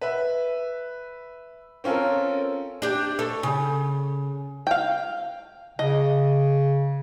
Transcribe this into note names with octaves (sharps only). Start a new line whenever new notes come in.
B4 E5
C4 C#4 F4 A4 A#4
D4 G4
A4 C#5
C#3
F5 G5
C#3 D#5